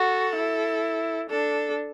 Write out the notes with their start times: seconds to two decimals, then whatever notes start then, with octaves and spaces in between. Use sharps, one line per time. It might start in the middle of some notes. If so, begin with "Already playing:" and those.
Already playing: F#4 A4
0.36 E4
1.30 D4 A4